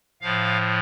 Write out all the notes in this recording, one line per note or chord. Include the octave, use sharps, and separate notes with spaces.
A2 F3 F5